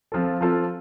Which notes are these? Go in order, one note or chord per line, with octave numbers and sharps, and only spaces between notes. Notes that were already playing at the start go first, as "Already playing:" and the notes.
F3 C4 F4 A4
F3 C4 F4 A4